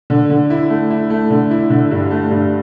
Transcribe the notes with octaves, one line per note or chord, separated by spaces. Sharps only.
D3
D3
E4
A3
E4
A3
D3
E4
D3
G2
A3
G2